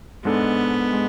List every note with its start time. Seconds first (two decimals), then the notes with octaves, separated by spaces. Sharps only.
0.25 G#2 G#3 B3 D4 A4
0.93 G#3